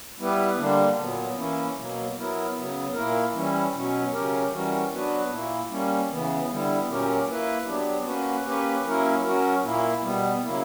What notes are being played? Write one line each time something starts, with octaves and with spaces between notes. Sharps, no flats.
G3 B3 E4 G4 B4
D3 G3 A#3 D4
A#2 F#3 B3
E3 A#3 C#4 E4
B2 F#3 A#3
F#3 B3 E4 A#4
C#3 F#3 B3
A#2 A#3 E4 A#4
E3 G3 C#4 E4
B2 F#3 C#4
C#3 F#3 C#4 G4 A#4
E3 G3 C#4 F#4 A#4
F#3 B3 D4 F#4 B4
A#2 A#3 E4
G3 A#3 C#4
C#3 E3 B3
D3 G3 B3 E4
A#2 F#3 C#4 G4 A#4
A#3 E4 B4
F#3 B3 D4 G4
A#3 C#4 F#4 B4
A#3 C#4 G4 B4
F#3 A#3 C#4 E4 A#4
F#3 C#4 F#4 A#4
A#2 A#3 E4
B2 G3 B3
C#3 F#3 A#3 E4